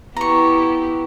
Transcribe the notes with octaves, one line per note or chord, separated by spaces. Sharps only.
B3 E4 G4 A#5 C#6